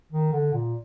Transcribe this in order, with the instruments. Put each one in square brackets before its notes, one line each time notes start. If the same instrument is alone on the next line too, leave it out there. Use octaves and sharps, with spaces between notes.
[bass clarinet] D#3
D3
A#2